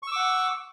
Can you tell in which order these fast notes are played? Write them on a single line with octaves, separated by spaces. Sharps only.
C#6 E6 D6 F#5